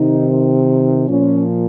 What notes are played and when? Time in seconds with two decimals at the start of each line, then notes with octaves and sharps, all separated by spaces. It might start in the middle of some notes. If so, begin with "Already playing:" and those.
Already playing: C3 D#3 D#4
1.08 A#2 F3 C#4